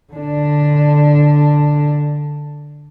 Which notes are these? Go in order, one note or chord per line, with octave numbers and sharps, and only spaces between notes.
D3 D4